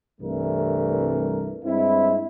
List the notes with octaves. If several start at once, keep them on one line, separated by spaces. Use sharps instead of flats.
C2 G2 C3 E3 A3 A#4
G2 G#3 C4 E4